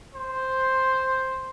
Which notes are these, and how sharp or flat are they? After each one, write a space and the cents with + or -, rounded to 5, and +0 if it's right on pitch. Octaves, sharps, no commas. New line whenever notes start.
C5 +5